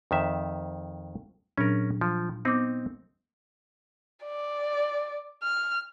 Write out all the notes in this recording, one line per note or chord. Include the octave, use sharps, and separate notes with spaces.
F2 D#3 E5
A#2 F#3 C#4 D4 A#4
F3
B3 C4 D#4 D6
D5
F6